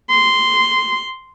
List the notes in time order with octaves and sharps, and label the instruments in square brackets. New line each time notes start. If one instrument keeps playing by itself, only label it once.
[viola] C6